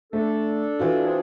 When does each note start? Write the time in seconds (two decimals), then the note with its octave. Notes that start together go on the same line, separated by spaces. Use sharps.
0.13 A3 D4 A4
0.79 E3 F4 F#4
1.05 C4 D4 G#4